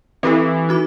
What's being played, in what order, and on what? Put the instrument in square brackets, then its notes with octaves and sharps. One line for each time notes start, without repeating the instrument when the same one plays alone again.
[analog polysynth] E3 [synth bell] C4 G4 A4
[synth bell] D#4 F#4 D6